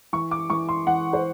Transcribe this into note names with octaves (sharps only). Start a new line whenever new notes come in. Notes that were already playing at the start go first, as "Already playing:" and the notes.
E3 C#6
D6
E3 C#6
C6
E3 F#5
C5